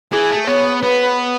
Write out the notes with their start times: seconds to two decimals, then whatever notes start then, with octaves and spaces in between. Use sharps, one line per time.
0.12 E3 G#4
0.30 A3
0.47 B3 C#5
0.83 B3 B4